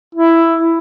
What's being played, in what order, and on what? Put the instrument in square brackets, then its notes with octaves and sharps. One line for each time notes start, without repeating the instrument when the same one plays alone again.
[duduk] E4